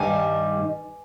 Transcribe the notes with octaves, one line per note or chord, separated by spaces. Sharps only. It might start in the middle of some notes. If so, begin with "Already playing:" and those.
Already playing: G2 D#3 G3 G#5